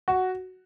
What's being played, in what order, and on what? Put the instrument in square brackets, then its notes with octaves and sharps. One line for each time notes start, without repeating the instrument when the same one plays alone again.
[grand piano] F#4